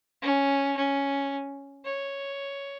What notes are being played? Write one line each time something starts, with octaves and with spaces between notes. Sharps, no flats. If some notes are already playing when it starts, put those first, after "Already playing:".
C#4
C#4
C#5